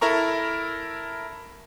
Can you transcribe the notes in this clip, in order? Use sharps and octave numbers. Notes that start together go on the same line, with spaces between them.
E4 A4 A#4 A#5 C#6